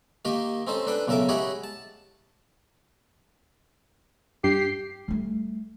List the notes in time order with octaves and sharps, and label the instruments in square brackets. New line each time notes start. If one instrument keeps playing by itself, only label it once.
[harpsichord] D#3 A#3 D#4 G4 D#5
C4 C#4 D#4 A4 C5
D4 A4 B4 G5
B1 C#3 A4 A#4 E5 D6
E4 G4 G#4 C#5 D#5 F#5
A5
[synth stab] G2 [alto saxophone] G4 [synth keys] C7
[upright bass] G3 A3